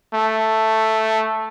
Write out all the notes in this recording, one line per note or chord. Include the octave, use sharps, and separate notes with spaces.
A3